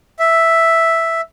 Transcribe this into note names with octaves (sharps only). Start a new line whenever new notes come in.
E5